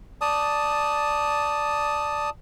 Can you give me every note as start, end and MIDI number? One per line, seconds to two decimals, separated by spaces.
0.21 2.30 74
0.21 2.30 81
0.21 2.30 87